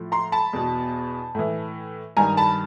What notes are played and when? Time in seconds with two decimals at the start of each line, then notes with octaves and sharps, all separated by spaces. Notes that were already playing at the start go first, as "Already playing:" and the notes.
Already playing: A2 F3
0.12 A#5 C6
0.32 A5 B5
0.53 E2 B2
1.35 A2 E3
2.17 G2 D#3 G#5 A#5
2.37 A5 B5